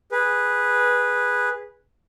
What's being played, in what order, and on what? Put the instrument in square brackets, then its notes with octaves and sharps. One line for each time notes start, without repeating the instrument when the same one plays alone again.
[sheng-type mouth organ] G#4 B4